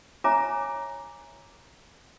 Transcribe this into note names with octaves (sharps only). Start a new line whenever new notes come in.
C#5 E5 G#5 A#5 D6